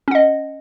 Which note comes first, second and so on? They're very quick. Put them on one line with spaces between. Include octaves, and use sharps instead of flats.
C#4 F#5 D#5